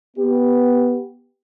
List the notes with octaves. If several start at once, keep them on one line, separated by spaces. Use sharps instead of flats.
B3 G4